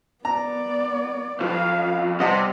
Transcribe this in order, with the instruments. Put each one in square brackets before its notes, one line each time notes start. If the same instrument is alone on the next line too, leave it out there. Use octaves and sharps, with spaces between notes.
[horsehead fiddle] B3 D5 [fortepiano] A#5
[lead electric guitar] B1 F2 [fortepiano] F3 [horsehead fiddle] F5
[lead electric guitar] C3 [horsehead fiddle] G3 [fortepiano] D#5 F#5 A5